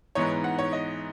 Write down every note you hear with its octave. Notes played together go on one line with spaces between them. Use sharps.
G#2 E3 B3 D#4 C#5
F#5
C#5
D#5